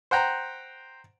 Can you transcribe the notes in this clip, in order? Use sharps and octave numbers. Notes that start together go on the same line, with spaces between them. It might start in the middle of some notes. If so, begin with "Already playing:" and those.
C5 F#5 G5 A#5